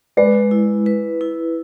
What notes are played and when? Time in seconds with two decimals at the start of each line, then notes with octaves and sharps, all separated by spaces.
0.17 G#3 B4 D5
0.51 E4
0.86 B4
1.21 E4